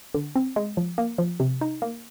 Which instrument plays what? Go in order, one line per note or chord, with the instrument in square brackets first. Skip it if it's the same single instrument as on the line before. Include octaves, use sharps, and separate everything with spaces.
[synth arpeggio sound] D3
C4
G#3
F3
A#3
F3
C3
D#4
A#3